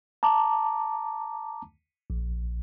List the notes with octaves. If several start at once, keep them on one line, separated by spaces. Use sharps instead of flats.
A5 A#5 D6
A#1